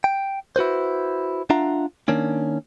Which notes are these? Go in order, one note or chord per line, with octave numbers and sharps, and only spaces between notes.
G5
E4 F#4 B4 C5
D4 F4 E5 F#5 A#5
D#3 A#3 C#4 D4